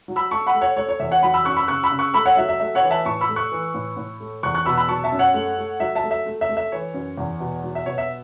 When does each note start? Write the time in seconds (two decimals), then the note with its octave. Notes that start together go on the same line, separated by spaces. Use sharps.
0.08 F#3
0.16 B5 E6
0.31 A3 A5 C#6
0.47 F#5 B5
0.54 A3
0.61 C#5 F#5
0.77 A3 C#5
0.89 C#5
1.00 E2 E5
1.11 C#5 F#5
1.23 F#3 F#5 B5
1.34 B5 E6
1.45 F#2 C#6 F#6
1.57 B5 E6
1.68 C#3 C#6 F#6
1.83 B5 E6
1.91 C#3
1.99 C#6 F#6
2.14 A3 B5 E6
2.26 C#5 F#5
2.37 F#3 E5
2.49 E5
2.60 A3 E5
2.75 C#5 F#5
2.83 E3
2.91 E5 A5
3.05 A2 A5 C#6
3.21 B5 E6
3.29 A3
3.36 C#6 F#6
3.52 E3
3.74 A2
3.97 A2
4.20 A3
4.43 E2 C#6 F#6
4.54 C#6 F#6
4.66 B2 B5 E6
4.77 B5 E6
4.89 F#3 A5 C#6
5.04 E5 A5
5.12 F#2
5.19 C#5 F#5
5.34 A3
5.58 A3
5.80 F#3 E5
5.95 E5 A5
6.03 A3
6.11 E5
6.26 A3
6.41 E5
6.49 A3
6.57 E5
6.72 E3 C#5
6.94 F#2
7.17 E2
7.40 B2
7.63 F#3
7.75 E5
7.86 B2 C#5
7.98 E5